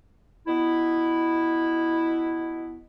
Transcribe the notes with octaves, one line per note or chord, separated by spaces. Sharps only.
B2 B3 E4